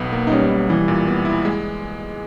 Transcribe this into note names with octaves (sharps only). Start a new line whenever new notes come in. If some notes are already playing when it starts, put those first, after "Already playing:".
Already playing: B1 B3
A#3
D#4
G3 C#4
B1
E3 G3
A#2
B3
E4
G#3